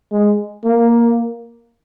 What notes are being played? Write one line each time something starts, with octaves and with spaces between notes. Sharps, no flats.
G#3
A#3